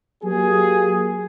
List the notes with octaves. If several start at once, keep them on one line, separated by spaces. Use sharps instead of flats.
F#3 A#3 G4 G#4